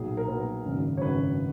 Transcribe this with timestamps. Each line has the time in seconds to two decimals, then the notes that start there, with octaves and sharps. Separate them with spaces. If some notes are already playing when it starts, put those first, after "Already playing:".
Already playing: B1 A#2 G#4
0.17 A#4
0.28 B1 A#2 B4
0.65 G#1 F#2 C#3
0.97 C#5
1.01 G#1 F#2 C#3 B4